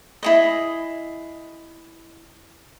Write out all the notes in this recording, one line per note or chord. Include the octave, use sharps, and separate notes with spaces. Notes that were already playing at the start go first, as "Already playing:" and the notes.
E4 G#4 D#5